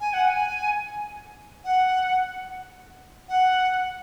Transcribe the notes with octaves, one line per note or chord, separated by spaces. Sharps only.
G#5
F#5
G#5
F#5
F#5